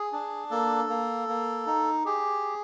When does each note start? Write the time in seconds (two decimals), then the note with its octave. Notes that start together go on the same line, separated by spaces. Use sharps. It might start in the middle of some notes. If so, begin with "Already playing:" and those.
Already playing: G#4
0.12 D4
0.51 A#3 A4
0.89 A#3
1.28 A#3
1.67 D#4
2.05 G4 G#4